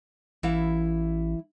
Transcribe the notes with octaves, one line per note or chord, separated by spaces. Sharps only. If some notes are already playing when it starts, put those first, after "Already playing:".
A1 E3 E4 F5